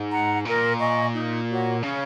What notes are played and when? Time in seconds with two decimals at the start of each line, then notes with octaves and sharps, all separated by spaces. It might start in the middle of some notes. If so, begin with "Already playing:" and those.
Already playing: G#2
0.11 F#5 A#5
0.45 A#2 A#4
0.80 D#5 G#5 C#6
1.13 D#4
1.49 F#4 C#5 F#5
1.82 C#3 C#4